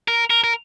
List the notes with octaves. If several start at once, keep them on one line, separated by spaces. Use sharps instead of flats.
A#4
A#4
A#4